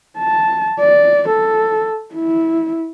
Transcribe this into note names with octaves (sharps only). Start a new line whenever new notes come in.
A5
D5
A4
E4